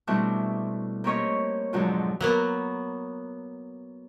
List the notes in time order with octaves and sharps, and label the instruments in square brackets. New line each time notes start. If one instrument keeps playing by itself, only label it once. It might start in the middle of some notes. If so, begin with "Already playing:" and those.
[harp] B2 G3 A3 C4 D4 E4
A#3 C4 C#4 G4 C#5 D#5
F2 G#2 B2 D3 F3 F#3
[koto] F#3 A#3 B3